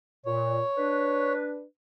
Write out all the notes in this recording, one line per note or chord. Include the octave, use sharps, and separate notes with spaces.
A#2 C#5
D4 B4